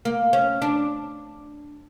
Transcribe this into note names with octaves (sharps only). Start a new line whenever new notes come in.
A#3
C#4
D4